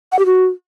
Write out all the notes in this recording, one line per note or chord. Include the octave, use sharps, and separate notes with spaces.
F#5
G4
F#4